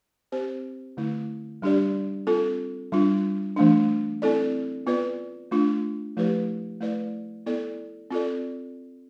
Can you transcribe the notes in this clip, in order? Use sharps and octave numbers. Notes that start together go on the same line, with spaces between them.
C4 G4 C5
D3 A3 E4
G3 D4 G4 D5
C4 F4 A4
G3 D4 F4
E3 A3 D4
C4 E4 A4 D5
B3 F4 B4 D5
A3 D4 F4
F3 A3 E4 G4 B4
A3 E4 B4 D5
B3 E4 A4 D5
C4 F4 A4 D5